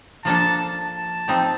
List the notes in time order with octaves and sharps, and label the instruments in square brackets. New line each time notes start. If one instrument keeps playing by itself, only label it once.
[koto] F3 A#3 D4 A4 [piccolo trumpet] A5
[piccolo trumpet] A5
[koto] F3 C4 D#4 G4